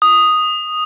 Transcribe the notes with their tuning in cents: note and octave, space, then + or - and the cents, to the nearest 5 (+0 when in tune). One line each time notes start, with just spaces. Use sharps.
D#6 +0